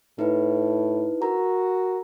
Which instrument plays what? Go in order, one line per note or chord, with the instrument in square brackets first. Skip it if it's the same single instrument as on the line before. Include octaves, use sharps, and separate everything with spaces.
[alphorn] A2 [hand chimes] D#4 E4 B4
[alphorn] F#4 [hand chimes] A#4 A#5